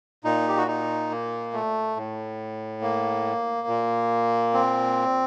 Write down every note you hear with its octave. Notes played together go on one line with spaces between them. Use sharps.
A#2 D#4
G4
F#4
D#4
A#3
A3
A2
A#3
A#2
C4